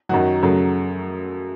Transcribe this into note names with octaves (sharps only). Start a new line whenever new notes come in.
F#2 D#3 F#3 F#4
F#2 C#3 F#3 A3